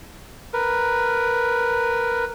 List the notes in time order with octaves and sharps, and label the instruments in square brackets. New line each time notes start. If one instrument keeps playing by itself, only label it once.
[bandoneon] A#4 B4